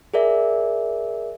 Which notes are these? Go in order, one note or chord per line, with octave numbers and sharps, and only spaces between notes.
G#4 A#4 D5 E5